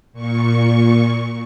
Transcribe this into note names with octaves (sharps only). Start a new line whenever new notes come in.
A#2 C#6